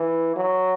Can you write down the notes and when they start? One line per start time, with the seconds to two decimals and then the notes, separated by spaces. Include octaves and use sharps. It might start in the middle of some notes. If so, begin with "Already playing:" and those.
Already playing: E3
0.36 F#3